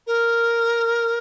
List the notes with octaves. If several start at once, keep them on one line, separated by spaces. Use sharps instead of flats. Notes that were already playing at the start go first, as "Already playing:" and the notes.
A#4